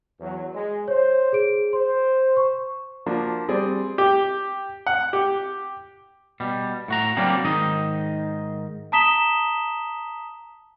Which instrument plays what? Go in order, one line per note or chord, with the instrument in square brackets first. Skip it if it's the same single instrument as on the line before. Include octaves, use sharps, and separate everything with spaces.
[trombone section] E2 F#3
G#3
[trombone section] C5 [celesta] C#5
[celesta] G#4 D7
[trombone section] C5 [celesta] C6
[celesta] C#6
[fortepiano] F3 A#3 D4 F#4
G3 C4 G#4 D5
G4
F#5
G4
[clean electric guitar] B2 G3
A2 F#4 A#5
F#3 G3 A#3 C4 D4
G#2 D#3 D#4 D#5
[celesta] A5 A#5 D#6 B6 E7 G7